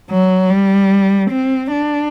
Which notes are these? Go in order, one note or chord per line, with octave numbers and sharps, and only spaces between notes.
F#3
G3
C4
D4